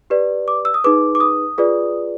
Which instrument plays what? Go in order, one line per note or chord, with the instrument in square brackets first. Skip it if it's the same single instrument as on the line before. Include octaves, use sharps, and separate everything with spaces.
[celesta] G4 B4 D5
D6
E6
D#6
D#4 G#4 B4 D6
D6
D#6
F4 G#4 B4 D5